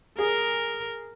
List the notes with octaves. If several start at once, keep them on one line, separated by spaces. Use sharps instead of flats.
G#4 A#4